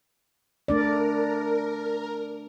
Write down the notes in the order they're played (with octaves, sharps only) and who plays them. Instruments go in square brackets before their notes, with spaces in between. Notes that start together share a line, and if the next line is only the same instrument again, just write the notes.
[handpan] A3 D4 D5 [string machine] A#4